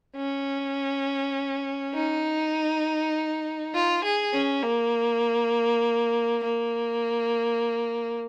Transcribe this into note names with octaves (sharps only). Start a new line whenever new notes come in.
C#4
D#4
F4
G#4
C#4
A#3
A#3